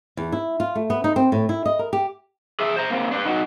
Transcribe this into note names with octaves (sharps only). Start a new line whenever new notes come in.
E2
E4
F4
A3
B3
D#4
C4
A2
E4
D#5
A#4
G4
G#4 E5
C5 A#5
A#3 C4
D4 B4
D#4 F#4